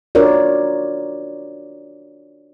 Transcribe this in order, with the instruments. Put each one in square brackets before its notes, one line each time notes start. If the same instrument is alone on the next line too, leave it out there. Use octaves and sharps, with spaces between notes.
[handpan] D4 F4 F#4 A#4 C#5 D5